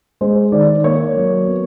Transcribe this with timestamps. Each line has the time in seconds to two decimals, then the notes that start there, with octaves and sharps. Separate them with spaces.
0.21 G#3 C5
0.52 D#3 D5
0.84 A#3 C#5
1.16 F#3
1.47 B3